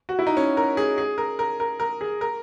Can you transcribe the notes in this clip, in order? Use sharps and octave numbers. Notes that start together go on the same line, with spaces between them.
F#4
E4
D#4
C#4
A#4
G#4
G#4
A#4
A#4
A#4
A#4
G#4
A#4